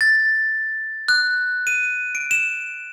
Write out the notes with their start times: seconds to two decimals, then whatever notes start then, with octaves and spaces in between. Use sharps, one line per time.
0.01 A6
1.08 F#6
1.67 D#7
2.15 D7
2.31 E7